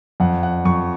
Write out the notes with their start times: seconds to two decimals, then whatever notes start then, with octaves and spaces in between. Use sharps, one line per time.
0.20 F2 F#5
0.43 F#5
0.65 F2 C#6